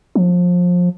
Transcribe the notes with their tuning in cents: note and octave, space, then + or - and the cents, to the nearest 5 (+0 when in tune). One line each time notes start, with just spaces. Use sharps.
F3 +25